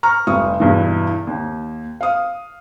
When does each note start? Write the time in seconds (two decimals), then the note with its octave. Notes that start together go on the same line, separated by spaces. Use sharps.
0.03 A#5 C#6 F6
0.27 F1 G3 C#6 D#6
0.60 E2 G2 B2 E3
1.27 D#2
2.01 F5 D#6